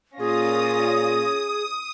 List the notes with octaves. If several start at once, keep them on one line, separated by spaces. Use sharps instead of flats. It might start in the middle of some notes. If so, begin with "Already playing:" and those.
A#2 C#4 F4 G#4 D#6 A#6